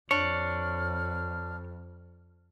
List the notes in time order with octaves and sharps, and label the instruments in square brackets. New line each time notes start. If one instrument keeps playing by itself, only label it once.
[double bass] F2 [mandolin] D4 [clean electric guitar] C#5 [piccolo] F6